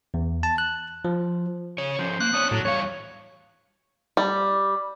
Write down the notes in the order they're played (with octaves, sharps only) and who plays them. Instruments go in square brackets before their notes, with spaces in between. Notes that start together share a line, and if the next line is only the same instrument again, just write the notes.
[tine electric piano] E2
A5
F#6
F3
[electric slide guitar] C#3 C#5
[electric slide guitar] F3 C#4 [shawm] C5
[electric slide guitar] A#3 [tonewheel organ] F#6
[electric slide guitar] B3 D4 C#5 [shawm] D#6
[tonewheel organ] A2 [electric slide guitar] F#3 [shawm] D4
[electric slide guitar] E2 G3 F5 [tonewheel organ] C#5 [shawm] C#6
[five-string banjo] G3